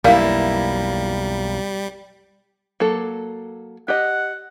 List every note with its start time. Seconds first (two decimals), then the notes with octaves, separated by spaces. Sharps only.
0.04 B1 F2 G3 A#3 E4 D5 F5
2.80 F#3 A#3 A4
3.88 G4 D#5 F#5